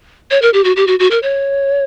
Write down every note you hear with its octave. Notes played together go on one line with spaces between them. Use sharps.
C#5
A#4
G4
F#4
G4
F#4
F#4
A#4
C#5